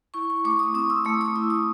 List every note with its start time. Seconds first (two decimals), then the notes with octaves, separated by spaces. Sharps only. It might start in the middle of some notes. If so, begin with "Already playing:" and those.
0.14 E4 C#6
0.30 C#6
0.44 A3 D6
0.59 D#6
0.74 C4 D#6
0.90 E6
1.05 A3 D#6
1.21 D#6
1.36 E4 E6
1.50 D#6